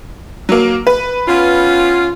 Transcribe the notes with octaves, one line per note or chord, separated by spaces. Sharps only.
F#3 A#3
B4
B3 C#4 F4